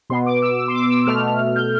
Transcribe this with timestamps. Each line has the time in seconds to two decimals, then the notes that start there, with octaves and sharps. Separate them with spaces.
0.10 B2 B3 C6
0.26 D6
0.42 E6
0.59 E6
0.68 C6
0.75 D6
0.90 E6
1.07 B2 A3 F6
1.56 G6